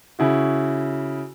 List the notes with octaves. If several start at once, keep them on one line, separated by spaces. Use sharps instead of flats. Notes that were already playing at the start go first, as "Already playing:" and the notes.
C#3 E4 F#4